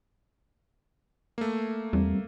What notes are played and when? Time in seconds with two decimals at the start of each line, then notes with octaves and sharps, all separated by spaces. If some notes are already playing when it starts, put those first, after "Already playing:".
1.38 A3 A#3
1.93 E2 G3 C4